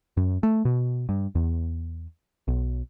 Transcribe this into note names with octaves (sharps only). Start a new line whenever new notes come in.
F#2
A3
B2
G2
E2
B1